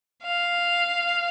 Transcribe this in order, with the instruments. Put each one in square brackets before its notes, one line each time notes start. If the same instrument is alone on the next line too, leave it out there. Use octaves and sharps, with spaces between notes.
[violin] F5